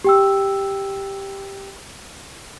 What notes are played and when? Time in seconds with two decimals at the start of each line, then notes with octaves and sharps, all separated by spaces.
0.04 G4 G5 E6